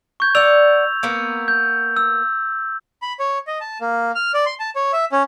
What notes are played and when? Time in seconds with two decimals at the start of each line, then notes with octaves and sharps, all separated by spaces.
0.20 C#6 G6 G#6
0.35 D5 F#5 E6 F7
1.03 A#3 B3 A#4
1.48 G6
1.97 E6
3.02 B5
3.19 C#5
3.47 D#5
3.61 A5
3.81 A#3
4.15 F6
4.34 D5
4.46 C6
4.60 A5
4.76 C#5
4.93 E5
5.12 C#4